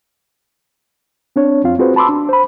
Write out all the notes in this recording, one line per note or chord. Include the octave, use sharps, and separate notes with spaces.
C4 D4 C#5
F2 C4 F4 F5
C4 F4 F#4 G#4 B4 C5
A5 B5 C6 D6 E6
D4
C5 B5